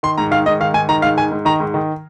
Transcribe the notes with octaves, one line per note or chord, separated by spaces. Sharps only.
D#3 C6
G#2 A#5
D#3 F5
G#2 D#5
D#3 F5
G#2 G#5
D#3 A#5
G#2 F5
D#3 G#5
G#2
D#3 A#5
G#2
D#3